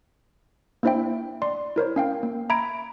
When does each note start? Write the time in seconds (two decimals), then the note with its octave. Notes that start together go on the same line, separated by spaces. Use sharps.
0.83 A#3 D4 E4 C5 E5 G5
1.42 D5 C6
1.76 E4 A#4 C5 C#5
1.96 C#4 F5 G5
2.23 A#3
2.49 E5 A#5 B5 G#6 D7